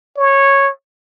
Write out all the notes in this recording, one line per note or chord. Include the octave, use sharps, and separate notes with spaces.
C#5